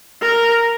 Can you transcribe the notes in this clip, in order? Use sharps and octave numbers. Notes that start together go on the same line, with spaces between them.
A#4